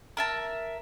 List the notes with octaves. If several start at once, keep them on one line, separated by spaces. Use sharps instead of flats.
A#4 E5 A5